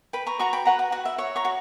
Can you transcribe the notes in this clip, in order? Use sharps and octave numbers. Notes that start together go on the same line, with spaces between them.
B4 G5 B5
A#5 C#6
F#4 A#5 C#6
G5 B5
B4 F#5 A#5
F#5
F#4 F#5
E5
C#5 E5
A#5 C#6
F#4